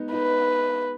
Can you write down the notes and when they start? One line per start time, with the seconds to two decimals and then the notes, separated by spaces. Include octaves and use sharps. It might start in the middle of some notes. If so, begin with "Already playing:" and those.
Already playing: G#3 B3 D#4
0.12 D#4 B4